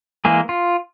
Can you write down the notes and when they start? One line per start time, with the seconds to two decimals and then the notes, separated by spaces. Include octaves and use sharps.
0.25 E3 G#3 A#3 G#4
0.49 F4